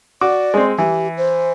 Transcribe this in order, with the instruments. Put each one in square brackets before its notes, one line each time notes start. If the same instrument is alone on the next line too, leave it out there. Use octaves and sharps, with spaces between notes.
[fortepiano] F#4 D6 [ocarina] D5
[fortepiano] G#3 C4
[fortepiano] E3 [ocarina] G4
[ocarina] C5